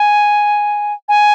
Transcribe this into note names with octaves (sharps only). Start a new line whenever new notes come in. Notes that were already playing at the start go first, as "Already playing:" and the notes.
Already playing: G#5
G#5